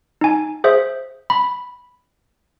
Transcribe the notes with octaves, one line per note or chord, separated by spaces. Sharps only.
D#4 G#5
G#4 C5 E5
B5